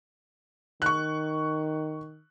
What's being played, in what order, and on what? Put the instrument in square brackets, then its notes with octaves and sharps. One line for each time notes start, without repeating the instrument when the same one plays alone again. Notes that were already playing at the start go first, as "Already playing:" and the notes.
[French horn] D#3 [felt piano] C#6 F#6